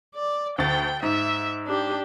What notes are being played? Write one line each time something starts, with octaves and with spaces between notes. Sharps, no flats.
D5
D2 G5 A6
G#2 E5
D4 G4